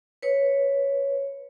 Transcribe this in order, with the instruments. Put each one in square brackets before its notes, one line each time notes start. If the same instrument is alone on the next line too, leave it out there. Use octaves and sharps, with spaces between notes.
[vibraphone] B4 C#5